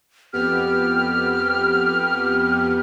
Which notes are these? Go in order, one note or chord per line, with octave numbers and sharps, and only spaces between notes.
F2 B3 G4 F6